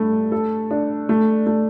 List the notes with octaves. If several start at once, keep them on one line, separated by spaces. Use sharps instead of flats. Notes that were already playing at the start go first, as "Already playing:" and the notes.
Already playing: G2 A3
A4
D4
A3
A3